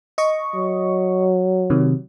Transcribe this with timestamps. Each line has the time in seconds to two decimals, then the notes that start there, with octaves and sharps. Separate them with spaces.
0.18 D#5 C#6
0.54 F#3
1.70 C3 D#3